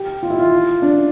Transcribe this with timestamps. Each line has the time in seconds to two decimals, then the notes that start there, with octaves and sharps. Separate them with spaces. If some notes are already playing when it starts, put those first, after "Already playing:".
Already playing: G4
0.23 F4
0.30 E4
0.39 F4
0.82 D4